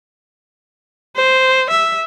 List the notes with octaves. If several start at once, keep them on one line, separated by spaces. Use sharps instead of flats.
C5
E5